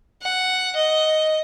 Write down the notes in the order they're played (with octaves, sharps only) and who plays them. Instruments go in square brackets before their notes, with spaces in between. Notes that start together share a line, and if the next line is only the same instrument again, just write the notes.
[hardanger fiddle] F#5
D#5